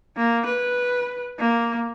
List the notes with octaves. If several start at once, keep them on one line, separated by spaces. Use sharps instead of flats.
A#3
B4
A#3